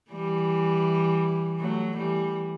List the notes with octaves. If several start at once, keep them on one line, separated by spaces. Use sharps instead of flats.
E3 G3
F#3 A3
E3 G3